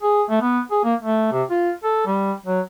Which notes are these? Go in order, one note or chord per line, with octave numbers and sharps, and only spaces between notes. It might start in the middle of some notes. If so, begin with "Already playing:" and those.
G#4
A3
B3
G#4
A#3
A3
C3
F4
A4
G3
F#3